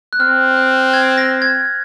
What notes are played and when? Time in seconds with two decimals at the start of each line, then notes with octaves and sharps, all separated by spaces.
0.13 F#6
0.20 C4 F6
0.57 F#6
0.94 G#6
1.17 A#6
1.42 G#6